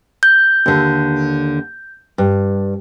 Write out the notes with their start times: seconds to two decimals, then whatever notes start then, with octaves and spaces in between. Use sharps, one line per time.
0.23 G6
0.66 D#2 D3
2.18 G2